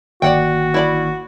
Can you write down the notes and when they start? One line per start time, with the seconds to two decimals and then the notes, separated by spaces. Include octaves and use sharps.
0.22 G1 D#3 A#3 F#4 D5 F#5 G5
0.74 E4 D5 B5